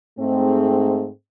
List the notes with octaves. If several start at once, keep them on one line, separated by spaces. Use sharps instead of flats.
G#2 A3 C4